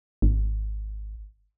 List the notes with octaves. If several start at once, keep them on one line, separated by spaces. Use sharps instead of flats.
G#1